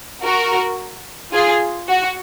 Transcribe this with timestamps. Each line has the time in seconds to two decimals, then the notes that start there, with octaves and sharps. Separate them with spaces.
0.23 F#4 A#4
1.33 F4 G#4
1.88 F#4